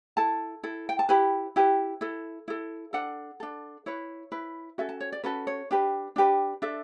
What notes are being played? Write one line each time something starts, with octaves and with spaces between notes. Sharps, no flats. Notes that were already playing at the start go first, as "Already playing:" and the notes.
E4 A4 A5
E4 A4
G5
A5
E4 G4 B4 B5
E4 G4 B4
E4 A4
E4 A4
D4 A4 F#5
D4 A4
E4 B4 C#5
E4 B4
C#4 F#4 A4 E5
A5
C#5
D5
C#4 F#4 A4 B4
C#5
D4 G4 B4
D4 G4 B4
D4 A4 E5